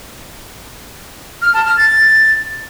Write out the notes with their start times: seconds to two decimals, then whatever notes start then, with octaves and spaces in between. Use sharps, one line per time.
1.42 F6
1.54 A5
1.65 F6
1.77 A6